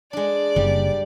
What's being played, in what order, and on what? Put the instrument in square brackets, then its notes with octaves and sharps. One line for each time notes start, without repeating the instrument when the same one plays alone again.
[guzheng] G#3 D4 [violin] D5
[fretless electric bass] F#1 [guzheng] G3